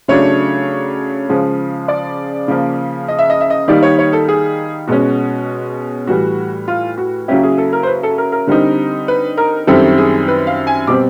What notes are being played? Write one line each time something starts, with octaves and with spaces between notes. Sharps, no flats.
C#3 F#3 A3 D4 C#5
C#3 F3 G#3
D5
C#3 F3 A#3
D#5
E5
D#5
E5
D#5
D#3 G3 A#3 D#4 D5
C#5
C#5
A4
G#4
B2 G#3 C#4 F#4
A2 E3 G3 F#4
F4
F#4
C#3 F#3 A#3 C#4 E4 G4
G#4
A4
A#4
C5
B4
A4
A#4
A#4
D3 G3 C4 D#4
B4
A#4
F#2 D#3 G3 C4 E4 A4
G#4
B4
F5
G#5
B2 G3 C4 D6